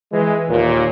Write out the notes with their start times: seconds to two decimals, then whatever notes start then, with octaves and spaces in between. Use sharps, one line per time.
0.12 E3 G#3
0.48 D#2 A#2